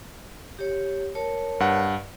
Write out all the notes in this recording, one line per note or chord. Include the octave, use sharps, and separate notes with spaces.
G4 C#5
A#4 C#5 A5
G2 F#5